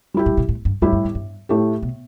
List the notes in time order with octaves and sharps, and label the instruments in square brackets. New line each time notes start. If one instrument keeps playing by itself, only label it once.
[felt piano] G3 E4 G4
[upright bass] A2
B2
A2
G2
[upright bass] E2 [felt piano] A2 G3 E4 G4
[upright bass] G2
E2
G2
[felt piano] A2 A3 G4
[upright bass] B2